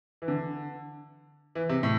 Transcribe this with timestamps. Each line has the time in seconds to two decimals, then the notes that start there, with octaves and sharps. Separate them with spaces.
0.22 E3
0.28 D3
1.55 E3
1.69 C3
1.83 A2